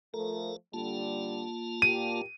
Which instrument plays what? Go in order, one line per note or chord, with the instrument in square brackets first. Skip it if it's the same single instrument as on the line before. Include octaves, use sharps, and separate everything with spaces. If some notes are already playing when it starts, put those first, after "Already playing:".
[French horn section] F3 A3 [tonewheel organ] A4 A#4 A#5
[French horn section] D3 G3 [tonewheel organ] A#3 F4 A5
[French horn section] A#2 G4 [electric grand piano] D#7